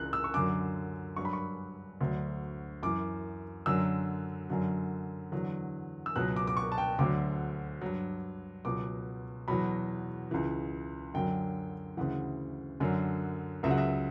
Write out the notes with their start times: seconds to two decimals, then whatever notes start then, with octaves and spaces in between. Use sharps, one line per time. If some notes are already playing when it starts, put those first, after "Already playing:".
Already playing: C#2 C#3 E3 F#6
0.13 E6
0.24 C#6
0.34 F#2 D3 F#3 D6
1.16 G2 F#3 C#6
1.25 B5
1.33 C#6
2.01 D2 D3 F#3
2.83 F#2 E3 D6
3.66 F#2 D3 F#3 E6
4.50 F#2 D3 F#3
5.32 E2 D3 F#3
6.06 E6
6.16 C#2 B2 F#3 F#6
6.36 D6
6.47 D6
6.57 C#6
6.72 A5
6.78 G5
6.99 D2 D3 F#3 D6
7.82 G2 F#3
8.65 C#2 B2 F#3 D6
9.48 E2 B2 F#3 B5
10.31 C#2 C#3 E3
11.14 F#2 D3 F#3 G5
11.97 D2 C#3 E3 F#5
12.80 F#2 D3 F#3
13.63 C#2 C#3 F#3 E5
13.71 F#5
13.78 E5